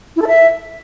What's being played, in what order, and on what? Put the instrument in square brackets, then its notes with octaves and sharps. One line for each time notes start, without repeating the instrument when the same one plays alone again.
[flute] E4
A4
E5